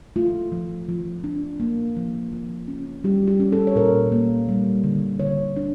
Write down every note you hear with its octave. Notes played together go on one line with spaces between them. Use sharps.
A3 F4
F3
F3
D4
A#3
F3
F3
C#4
G3 G4
G4
C#4
A4
C#5
A#2 A#4
A#3
G3
D3
D3 C#5
D4